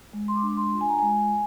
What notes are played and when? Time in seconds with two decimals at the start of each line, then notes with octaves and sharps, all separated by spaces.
0.13 G#3
0.28 C6
0.36 D6
0.42 D4
0.57 C6
0.72 F4
0.81 G#5
0.89 A#5
0.99 G#3 G#5